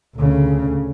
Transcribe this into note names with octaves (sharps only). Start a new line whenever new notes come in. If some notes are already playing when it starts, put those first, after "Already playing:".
D2 C#3